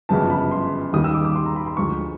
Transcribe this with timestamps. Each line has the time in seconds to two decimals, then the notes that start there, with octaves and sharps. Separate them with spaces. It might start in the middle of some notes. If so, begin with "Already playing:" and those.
0.09 G1 F#2 C#3 F3 G#3 A5
0.30 B5
0.51 C6
0.93 D#2 D#3 G3 D#6
1.04 E6
1.14 D6
1.25 D6
1.35 C6
1.46 A#5
1.56 B5
1.66 C6
1.77 D2 D3 F3 G#3 C#6